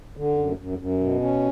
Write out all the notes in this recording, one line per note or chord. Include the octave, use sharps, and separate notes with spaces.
D3
F#2
F#2
F#2
B2
C#4